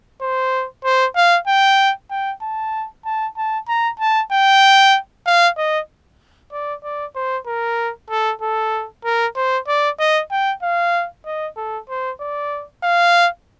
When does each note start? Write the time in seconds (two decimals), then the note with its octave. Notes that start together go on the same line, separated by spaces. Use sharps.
0.21 C5
0.84 C5
1.16 F5
1.47 G5
2.10 G5
2.42 A5
3.05 A5
3.37 A5
3.68 A#5
4.00 A5
4.32 G5
5.27 F5
5.57 D#5
6.52 D5
6.84 D5
7.15 C5
7.47 A#4
8.10 A4
8.42 A4
9.05 A#4
9.36 C5
9.68 D5
10.00 D#5
10.31 G5
10.62 F5
11.26 D#5
11.57 A4
11.89 C5
12.20 D5
12.84 F5